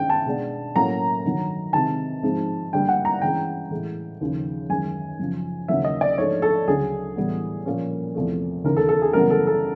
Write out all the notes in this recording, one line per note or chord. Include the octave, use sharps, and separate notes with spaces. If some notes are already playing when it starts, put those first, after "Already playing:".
Already playing: G2 D#3 G#3 C#4 G5
A5
B2 G#3 B3 D4
A2 F#3 A#3 C#4 A#5
G2 D#3 F#3
C3 D#3 G#3 A5
G#2 F3 G#3 C4
G2 D3 G3 A#3 G5
F#5
A#5
G2 E3 G#3 C#4 G5
A2 E3 G#3
D#2 C#3 F3
F#2 D#3 G#3 G#5
F#2 C#3 F3
D#2 C#3 F#3 A#3 E5
D#5
D5
G#2 F3 A3 D4 C#5
A4
D2 C#3 F#3 G#4
A2 E3 G3 B3
A#2 F3 A#3 C#4
E2 C3 F3 A3
D#2 C#3 E3 A#4
A4
A4
G#4
F#2 C#3 E3 G3 B3 A#4
A4
A4